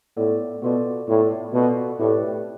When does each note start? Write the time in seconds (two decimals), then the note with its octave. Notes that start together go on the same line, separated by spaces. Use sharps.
0.17 A2 B3 F4 A4 D5
0.62 B2 B3 F4 A4 D5
1.08 A2 B3 F4 A4 D5
1.53 B2 B3 F4 A4 D5
1.99 A2 A3 C4 G4 B4 D5